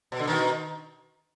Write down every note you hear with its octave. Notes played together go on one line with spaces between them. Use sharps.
B2
D3
B2 D#3